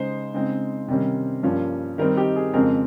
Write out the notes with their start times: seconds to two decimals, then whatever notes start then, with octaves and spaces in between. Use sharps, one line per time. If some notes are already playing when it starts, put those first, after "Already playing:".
Already playing: C#3 G#3 D#4 C5
0.34 C#3 G#3 C4 D#4
0.88 C3 D#3 G3 C#4
1.43 G2 F3 A#3 C#4
1.98 D#3 G3 C4 D#4 A#4
2.17 G4
2.36 G#4
2.54 F2 C#3 G#3 C4 A#4